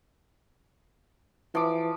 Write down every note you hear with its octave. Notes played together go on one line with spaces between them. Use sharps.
E3 F3 D6